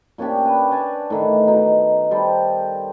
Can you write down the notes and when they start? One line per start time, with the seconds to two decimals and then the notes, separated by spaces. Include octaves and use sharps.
0.18 A#2 C#4 D4 G4
0.45 B4
0.71 D5 G#5 A5
1.10 A2 D#3 E3
1.47 B2 D#4
2.11 G3 A4 C5